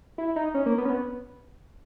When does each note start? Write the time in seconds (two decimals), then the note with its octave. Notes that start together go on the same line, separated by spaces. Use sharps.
0.18 E4
0.36 D#4
0.54 C#4
0.66 A#3
0.78 B3
0.85 C#4
0.90 B3